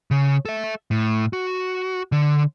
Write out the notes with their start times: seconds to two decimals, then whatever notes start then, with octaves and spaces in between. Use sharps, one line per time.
0.11 C#3
0.45 A4 E5
0.91 A2
1.33 F#4
2.12 D3